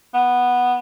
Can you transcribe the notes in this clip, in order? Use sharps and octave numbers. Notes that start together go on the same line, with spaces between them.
B3